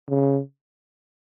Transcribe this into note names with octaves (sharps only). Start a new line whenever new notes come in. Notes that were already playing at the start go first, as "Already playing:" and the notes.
C#3